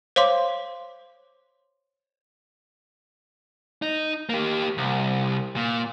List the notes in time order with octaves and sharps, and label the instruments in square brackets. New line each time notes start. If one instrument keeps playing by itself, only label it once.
[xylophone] C5 C#5 F5 C6 D6
[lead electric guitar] D#4
A#3 G4
C2
A#2